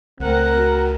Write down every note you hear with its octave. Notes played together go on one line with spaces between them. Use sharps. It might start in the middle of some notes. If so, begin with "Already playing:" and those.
C#2 A3 C4 A#4 F#5
F#4